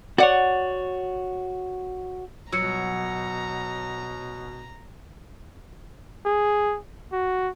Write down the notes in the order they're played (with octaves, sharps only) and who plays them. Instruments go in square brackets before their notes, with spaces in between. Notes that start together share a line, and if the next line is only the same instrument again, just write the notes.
[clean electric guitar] F#4 C#5 [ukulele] D5 F#5
[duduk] B2 [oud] F#3 [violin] A#5 [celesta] E6 C#7
[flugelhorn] G#4
F#4